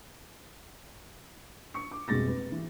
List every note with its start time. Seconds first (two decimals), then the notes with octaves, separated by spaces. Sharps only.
1.74 C#6 C#7
1.91 D6
2.08 F1 B2 G3 G#3 A6 A#6
2.27 B4
2.52 E3